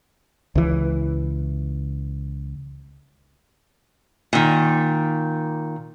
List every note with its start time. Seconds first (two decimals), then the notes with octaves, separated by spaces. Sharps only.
0.55 C#2 E3
4.33 A#2 D#3